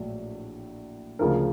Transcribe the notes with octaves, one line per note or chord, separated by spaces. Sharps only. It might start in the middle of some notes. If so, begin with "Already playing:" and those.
Already playing: A#1 A2 F#3
D2 C#3 F3 A#4